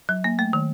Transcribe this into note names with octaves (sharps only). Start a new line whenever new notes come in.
F#3
A#3
A3
D#3